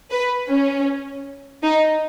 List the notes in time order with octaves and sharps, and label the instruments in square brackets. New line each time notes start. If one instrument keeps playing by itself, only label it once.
[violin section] B4
C#4
D#4